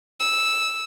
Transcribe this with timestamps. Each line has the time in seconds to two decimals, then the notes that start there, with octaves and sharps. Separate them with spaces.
0.20 E6